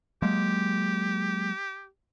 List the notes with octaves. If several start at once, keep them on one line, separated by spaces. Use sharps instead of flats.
F#3 G#3 A#3 G4